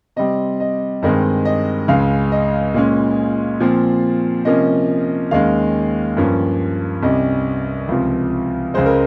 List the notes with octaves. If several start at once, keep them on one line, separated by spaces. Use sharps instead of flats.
C3 G3 C4 D#5
D#5
G2 D#3 G#3 C4 D#5
D#5
C#2 C#3 G#3 F5
D#5
A#2 G#3 C#4
A#2 F3 C4
C3 F3 A#3 C#4 D#5
D#2 D#3 G#3 C#4 F5
G2 F3 A#3 C#4
C2 C3 G3 C#4 D#5
C#2 C3 F3
C#2 C#3 G#3 C5
A#4